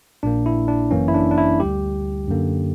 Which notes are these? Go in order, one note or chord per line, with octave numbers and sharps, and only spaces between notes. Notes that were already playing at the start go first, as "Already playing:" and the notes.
A#1 A#2 A#3 D4
E4
D4
G1 F#2 E3 A#3 C#4
E4
D4
D4
E4
D2 D3 G3 G4
F#2 D3 A#3